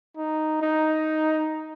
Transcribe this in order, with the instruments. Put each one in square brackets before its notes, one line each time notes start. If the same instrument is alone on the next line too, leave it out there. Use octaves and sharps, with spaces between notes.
[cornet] D#4
D#4